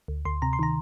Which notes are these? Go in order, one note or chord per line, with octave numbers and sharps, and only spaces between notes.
D2
D2 C6
C3 A#5
C6
D#3 A#5